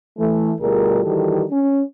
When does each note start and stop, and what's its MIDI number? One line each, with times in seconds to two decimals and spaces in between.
0.18 0.53 52
0.18 0.53 57
0.61 1.00 38
0.61 1.00 47
0.61 1.00 55
0.61 1.00 65
0.61 1.00 68
0.61 1.00 70
1.05 1.43 51
1.05 1.43 52
1.05 1.43 55
1.05 1.43 66
1.05 1.43 67
1.05 1.43 69
1.51 1.81 61